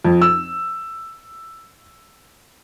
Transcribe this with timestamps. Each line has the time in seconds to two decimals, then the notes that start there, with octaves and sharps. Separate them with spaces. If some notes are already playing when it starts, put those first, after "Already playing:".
0.05 F2
0.22 E6